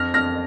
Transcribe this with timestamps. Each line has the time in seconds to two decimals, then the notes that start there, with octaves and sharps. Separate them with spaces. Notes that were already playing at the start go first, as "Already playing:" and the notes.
Already playing: F2 F6 A#6
0.14 F2 F6 A#6